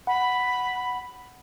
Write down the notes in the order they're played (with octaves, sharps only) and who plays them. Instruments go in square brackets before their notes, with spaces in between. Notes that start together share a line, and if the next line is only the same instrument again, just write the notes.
[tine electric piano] F#5 [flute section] B5